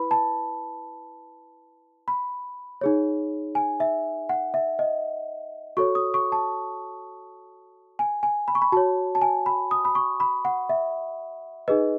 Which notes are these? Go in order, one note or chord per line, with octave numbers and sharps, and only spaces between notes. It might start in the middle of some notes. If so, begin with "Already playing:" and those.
Already playing: E4 B4 B5
A5
B5
D#4 G#4 C#5
G#5
E5
F#5
E5
D#5
F#4 A4 C#5 C#6
D#6
C#6
A5
G#5
G#5
B5
C#6
B5
F#4 C#5 A5
A5
G#5
B5
D#6
B5
C#6
B5
F#5
E5
D#4 G#4 B4 D#5